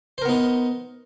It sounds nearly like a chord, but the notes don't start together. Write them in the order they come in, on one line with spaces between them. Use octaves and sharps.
C5 A#4 B3 D#4